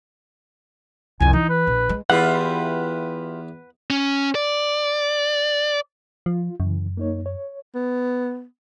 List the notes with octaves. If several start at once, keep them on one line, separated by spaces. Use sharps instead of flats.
C2 F2 G#5
E3 D#4
B4
A#1
G#3
E2 E4 F4 G4 B4 F#5
C#4
D5
F3 F4
F#2 C#3 E3
A#3 D#4 C#5
C#5
B3